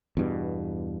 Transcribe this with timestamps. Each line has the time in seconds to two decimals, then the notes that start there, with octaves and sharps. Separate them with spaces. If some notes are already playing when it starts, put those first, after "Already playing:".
0.17 E2 G2 B2